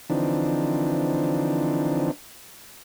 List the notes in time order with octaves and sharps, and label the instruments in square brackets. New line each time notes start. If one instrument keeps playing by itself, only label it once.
[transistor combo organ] D3 E3 F3 C4 D4 D#4